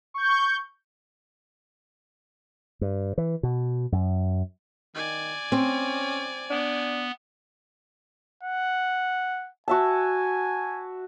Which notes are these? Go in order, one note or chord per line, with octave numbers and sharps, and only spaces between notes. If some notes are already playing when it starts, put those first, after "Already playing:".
C#6 G6
G2
E3
B2
F#2
D#3 D5 G#5
C4 C#4
B3 D4
F#5
F#4 E5 G#5 A5